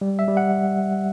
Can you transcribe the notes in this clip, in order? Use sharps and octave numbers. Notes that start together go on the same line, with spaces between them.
G3
E5
G3
F#5